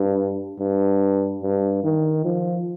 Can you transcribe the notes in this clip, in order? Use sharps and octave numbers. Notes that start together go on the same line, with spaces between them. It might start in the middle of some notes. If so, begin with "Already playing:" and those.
Already playing: G2
G2
G2
D#3
F3